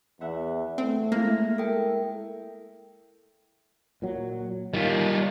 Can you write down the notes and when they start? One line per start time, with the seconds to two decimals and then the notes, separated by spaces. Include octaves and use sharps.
0.21 E2 E5 F#5 B5
0.78 A3 C4
1.12 G#3 A#3 E4 F6 A#6
1.58 A4 A#4 G5
4.02 A#2 F#3
4.74 D#3 G3 F4